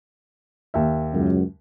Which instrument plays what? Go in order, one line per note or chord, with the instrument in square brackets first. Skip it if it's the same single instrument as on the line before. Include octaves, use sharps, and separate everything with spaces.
[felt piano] D#2 E5
[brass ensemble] C#2 F#2